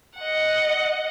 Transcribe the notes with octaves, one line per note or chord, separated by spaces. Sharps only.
D#5 F#5